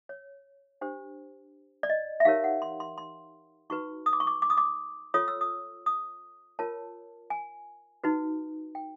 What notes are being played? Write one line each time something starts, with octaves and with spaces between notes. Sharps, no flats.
C#5
D4 G4 C5
D5
D#5
E5
D#4 G4 A#4 C#5 F5
F#5
C6
C6
C6
D#4 F#4 B4 C#6
D#6
D6
C#6
D6
D6
D#6
D6
F4 A4 C#5 D#6
E6
D#6
D#6
F4 A#4 C#5 A5
G#5
D#4 F#4 B4
G5